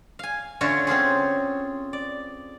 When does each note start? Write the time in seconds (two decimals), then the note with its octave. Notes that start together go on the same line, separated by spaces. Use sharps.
0.19 F5 G#5
0.61 D3 A3 C#4 F4 F#4 C#5
0.87 C4 C#4 F4 G#4
1.93 D5